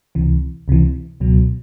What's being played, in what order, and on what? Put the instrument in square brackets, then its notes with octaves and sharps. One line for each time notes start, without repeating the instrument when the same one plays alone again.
[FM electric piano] C#2 C3 E3
C#2 C3 E3
C#2 B2 F#3